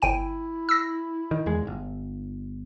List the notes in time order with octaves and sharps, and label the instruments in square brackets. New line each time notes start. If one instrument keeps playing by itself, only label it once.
[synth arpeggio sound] G1 G5 D#7 [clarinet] E4
[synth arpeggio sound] E6 A#6
[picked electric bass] D#3
E2 G#3
D1 G1